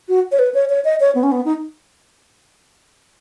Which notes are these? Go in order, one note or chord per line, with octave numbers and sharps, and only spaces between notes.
F#4
C#5
B4
C#5
C#5
D#5
C#5
B3
C#4
B3
D#4